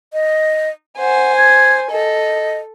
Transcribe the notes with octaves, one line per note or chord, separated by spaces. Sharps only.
D#5
C5 F#5 G#5
G#6
A4 D#5